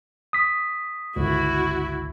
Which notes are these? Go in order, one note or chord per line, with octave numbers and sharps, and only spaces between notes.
D#6 B6
G1 C#2 E4 F#4